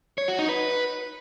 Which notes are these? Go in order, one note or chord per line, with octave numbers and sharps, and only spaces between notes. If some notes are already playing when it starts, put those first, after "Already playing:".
C#5
F#4
D#4
B4